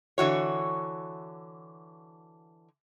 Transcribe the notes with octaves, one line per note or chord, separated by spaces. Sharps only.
D3 E3 F#4 C#5